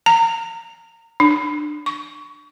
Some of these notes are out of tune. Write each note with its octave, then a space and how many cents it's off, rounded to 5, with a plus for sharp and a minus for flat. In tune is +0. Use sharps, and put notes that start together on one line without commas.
A#5 -30
D4 +25
C#6 +25